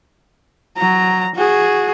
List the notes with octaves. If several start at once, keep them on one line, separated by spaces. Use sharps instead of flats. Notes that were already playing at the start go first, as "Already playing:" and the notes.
F#3 A#5
F#4 G#4